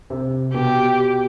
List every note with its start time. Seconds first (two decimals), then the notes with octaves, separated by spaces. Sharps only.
0.10 C3
0.54 B2 G4